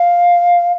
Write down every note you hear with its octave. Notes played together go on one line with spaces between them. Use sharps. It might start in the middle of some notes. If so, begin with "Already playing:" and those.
Already playing: F5